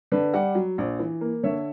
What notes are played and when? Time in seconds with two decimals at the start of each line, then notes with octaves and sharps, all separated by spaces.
0.12 D3 B4 D5
0.34 G3 D5 F#5
0.55 F#3
0.78 A#1
0.99 E3
1.21 A#3
1.43 D3 C#5 E5